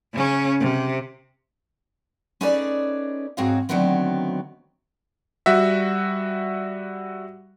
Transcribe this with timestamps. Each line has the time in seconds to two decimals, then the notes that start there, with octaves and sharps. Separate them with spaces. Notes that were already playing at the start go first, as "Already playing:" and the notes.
0.13 C#3 C#4
0.60 C3
2.41 C#4 D#4 G#4 A4 B4 D5
3.37 G#2 C4 F#4 G#4 C#5 F5
3.69 D3 D#3 F#3 A3 B3 C4
5.46 G3 F#4 E5